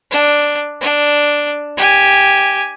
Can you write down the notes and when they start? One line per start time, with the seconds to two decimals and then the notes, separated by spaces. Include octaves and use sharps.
0.11 D4
0.81 D4
1.77 G4 G#5